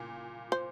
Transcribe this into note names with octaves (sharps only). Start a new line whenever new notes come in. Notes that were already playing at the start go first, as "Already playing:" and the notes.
Already playing: A#2 C#3
C5